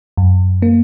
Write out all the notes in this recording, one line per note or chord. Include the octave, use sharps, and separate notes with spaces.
F#2
A#3